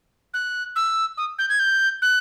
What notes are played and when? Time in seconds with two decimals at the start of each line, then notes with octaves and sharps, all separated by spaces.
0.34 F#6
0.76 E6
1.17 D#6
1.39 G6
1.49 G#6
1.59 G6
2.02 F#6